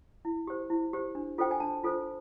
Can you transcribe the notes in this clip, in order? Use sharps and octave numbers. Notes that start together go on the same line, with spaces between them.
E4
G4 C5
E4
G4 C5
D4
F4 A4 C5 G5
G#5
D4 A5
F4 A4 C5